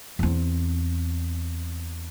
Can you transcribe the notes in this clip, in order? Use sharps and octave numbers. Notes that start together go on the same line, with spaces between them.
E2 C4